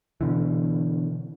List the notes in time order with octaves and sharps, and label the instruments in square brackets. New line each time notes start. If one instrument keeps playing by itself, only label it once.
[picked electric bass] B2 D3 E3